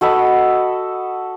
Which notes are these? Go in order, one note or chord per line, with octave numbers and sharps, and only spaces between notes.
F#4 A4 D#5 B5